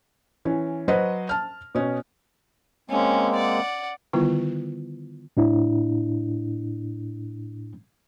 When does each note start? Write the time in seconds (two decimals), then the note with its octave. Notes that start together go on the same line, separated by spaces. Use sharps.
0.45 E3 C#4
0.88 F#3 F#4 B4 C5 D#5
1.29 A5 F6
1.75 B2 C#4
2.90 G#3 A#3 C4 C#4
3.35 D5 F#5
4.13 D3 D#3 G3 B3 E4 F4
5.37 A2 D4 E4